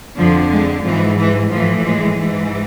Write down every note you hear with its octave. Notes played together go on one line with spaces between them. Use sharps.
F2 D3 F3
G#3
G#2 E3 F3
E3
A2 E3 F3
G#3
G#2 E3